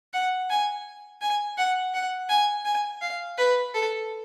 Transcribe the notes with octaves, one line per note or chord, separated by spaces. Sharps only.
F#5
G#5
G#5
F#5
F#5
G#5
G#5
F5
B4
A4